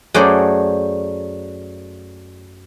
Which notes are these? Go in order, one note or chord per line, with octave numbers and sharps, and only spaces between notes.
F#2 A3 F#4 G#4 C5 D5